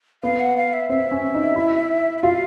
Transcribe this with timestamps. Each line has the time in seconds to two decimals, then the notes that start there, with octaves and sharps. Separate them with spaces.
0.23 B3 F5
0.40 F#5
0.57 F5
0.73 E5
0.89 C4 E5
1.11 C#4
1.34 D#4
1.56 E4
2.18 E5
2.23 F4 F5